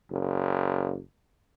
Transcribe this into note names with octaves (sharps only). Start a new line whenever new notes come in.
F#1